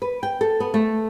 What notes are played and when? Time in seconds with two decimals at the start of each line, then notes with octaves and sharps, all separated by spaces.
0.02 B4
0.23 G5
0.41 A4
0.60 B3
0.74 A3